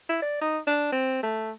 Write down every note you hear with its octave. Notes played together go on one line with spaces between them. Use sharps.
E4
D5
D#4
D4
C4
A3